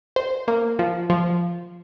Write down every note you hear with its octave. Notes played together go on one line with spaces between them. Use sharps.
C5
A#3
F3
F3